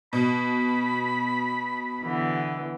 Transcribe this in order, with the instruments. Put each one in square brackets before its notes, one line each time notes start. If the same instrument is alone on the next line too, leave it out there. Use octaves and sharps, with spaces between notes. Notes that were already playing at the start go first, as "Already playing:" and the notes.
[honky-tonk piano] B2 [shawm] B5
[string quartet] D3 E3 B3